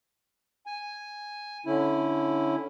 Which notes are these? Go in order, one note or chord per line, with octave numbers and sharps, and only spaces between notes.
G#5
D3 C#4 E4